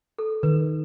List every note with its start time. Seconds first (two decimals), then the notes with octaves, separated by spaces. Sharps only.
0.18 A4
0.43 D#3 B4